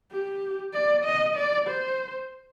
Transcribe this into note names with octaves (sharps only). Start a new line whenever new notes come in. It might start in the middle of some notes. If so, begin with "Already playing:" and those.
G4
D5
D#5
D5
C5